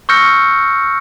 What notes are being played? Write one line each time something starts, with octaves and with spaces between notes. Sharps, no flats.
C#6 E6 F6 G6 A#6 C#7